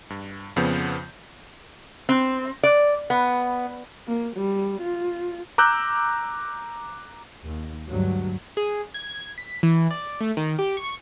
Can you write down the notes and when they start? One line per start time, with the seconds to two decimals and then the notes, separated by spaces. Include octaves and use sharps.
0.10 G2
0.56 F2 C#3 F3 B3 G6
2.09 C4
2.63 D5
3.10 B3
4.08 A#3
4.36 G3
4.82 F4
5.58 A#5 D6 E6 F#6 G6
7.44 D#2
7.88 D2 G2 F#3
8.57 G#4
8.94 G#6
9.38 B6
9.63 E3
9.91 D5
10.21 A3
10.37 D#3
10.59 G4
10.77 C#6